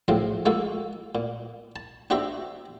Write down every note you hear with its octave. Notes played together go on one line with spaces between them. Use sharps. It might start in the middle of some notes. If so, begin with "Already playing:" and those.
A2 C#3 F3 F#3 C4
G#3 A#3 F4 F#4 A4
A#2
A5
D4 F#4 G4 C5 E5 A#5